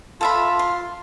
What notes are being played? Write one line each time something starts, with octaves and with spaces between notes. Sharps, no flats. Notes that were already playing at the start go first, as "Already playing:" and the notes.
F4 A4 E5 B5
C6